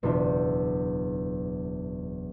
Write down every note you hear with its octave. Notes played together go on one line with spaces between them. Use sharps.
F#1 E2 B2 D4 F4